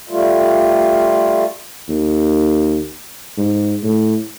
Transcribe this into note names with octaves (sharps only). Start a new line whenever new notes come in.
G3 A3 F4
D#2
G#2
A2